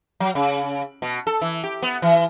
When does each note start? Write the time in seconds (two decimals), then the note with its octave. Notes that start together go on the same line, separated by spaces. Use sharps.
0.20 F#3
0.35 C#3
1.02 B2
1.27 A4
1.41 E3
1.64 G4
1.82 B3
2.02 E3